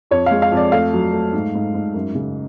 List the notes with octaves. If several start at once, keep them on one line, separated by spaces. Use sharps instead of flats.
F2 C#5
G#3 F5
F5
F2
D5
A3 F5
F#3
A3
G#2
G#2
G#2
F#2
C#3